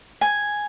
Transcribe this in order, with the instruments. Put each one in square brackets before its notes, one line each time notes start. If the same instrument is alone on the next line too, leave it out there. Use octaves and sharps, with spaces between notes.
[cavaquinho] G#5